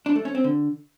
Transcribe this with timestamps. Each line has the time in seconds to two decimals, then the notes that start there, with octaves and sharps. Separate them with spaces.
0.06 D4
0.16 A3
0.25 C#4
0.35 C4
0.44 D3